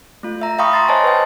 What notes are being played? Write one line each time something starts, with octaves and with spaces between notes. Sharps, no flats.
A3 F4
E5 A#5
E5 F5 G5 B5 C#6 D#6
A#5 C6 A6
C5 C#5 D#5 G#5 A5
B4 G5